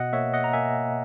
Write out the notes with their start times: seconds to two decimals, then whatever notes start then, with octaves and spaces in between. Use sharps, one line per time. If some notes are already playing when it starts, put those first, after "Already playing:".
Already playing: B2 D#5 F#5
0.13 A#3 C#5 E5
0.34 D#5 F#5
0.44 A#5
0.53 A#3 E5 G#5